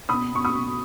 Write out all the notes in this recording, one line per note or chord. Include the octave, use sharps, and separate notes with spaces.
B2 B5 D#6
B2 C#6
B5 D#6
B2